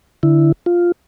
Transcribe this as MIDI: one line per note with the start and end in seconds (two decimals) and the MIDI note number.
0.23 0.52 50
0.23 0.52 64
0.66 0.92 65